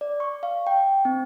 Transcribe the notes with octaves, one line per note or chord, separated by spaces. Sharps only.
D5
C#6
F5
G5
C4